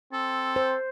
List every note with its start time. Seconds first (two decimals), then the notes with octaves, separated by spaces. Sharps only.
0.13 C4 A4
0.56 C5